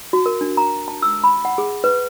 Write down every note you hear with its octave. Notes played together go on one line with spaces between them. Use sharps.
F#4
A#4
D4
A#5
A5
E6
B5
F#5
G#4
B4